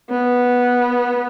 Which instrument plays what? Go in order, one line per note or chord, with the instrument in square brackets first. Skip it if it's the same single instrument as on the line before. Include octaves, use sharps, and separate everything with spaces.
[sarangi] B3